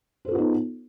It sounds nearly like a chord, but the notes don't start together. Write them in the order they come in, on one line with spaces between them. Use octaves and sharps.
C5 A4 F4 B3 D#4